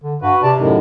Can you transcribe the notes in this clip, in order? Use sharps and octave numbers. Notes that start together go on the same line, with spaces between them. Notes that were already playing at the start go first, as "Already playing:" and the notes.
D3
G2 F#4 B4
C3 D5 A5
F#2 A2 D#3